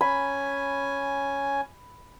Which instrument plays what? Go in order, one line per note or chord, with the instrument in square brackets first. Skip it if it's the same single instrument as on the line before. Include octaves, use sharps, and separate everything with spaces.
[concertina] C#4 G#5 [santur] B5